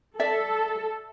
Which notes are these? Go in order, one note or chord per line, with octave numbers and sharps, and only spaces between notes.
A4 D5 E5